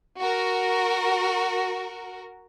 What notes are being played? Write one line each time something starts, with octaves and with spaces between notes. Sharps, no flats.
F#4 A#4